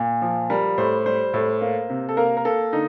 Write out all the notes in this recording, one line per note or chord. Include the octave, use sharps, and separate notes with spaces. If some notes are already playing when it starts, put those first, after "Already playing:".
Already playing: A#2
F3
G3 A#4
A2 C5
G3 C5
A2
A#3
C3
A4
A#3 A#4
A#4
A#3 A4
D3 D#4